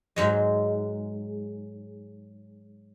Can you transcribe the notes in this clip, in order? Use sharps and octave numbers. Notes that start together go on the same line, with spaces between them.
G#2 F#3 G#3